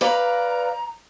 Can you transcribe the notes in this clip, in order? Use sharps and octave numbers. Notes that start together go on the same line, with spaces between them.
B4 D5 F5 A#5